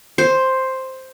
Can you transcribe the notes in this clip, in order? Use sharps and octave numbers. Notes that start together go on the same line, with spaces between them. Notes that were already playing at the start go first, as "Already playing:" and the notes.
C5